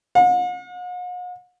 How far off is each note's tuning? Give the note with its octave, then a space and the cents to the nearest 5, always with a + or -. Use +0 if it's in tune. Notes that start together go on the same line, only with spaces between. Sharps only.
F#5 -45